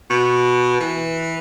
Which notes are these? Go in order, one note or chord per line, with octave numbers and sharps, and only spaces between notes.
B2
E3